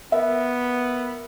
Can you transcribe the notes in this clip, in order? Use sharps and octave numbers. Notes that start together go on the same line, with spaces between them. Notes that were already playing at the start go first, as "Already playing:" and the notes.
B3 A#4 E5